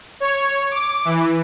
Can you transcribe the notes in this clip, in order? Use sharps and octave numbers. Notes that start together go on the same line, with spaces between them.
C#5
D6
E3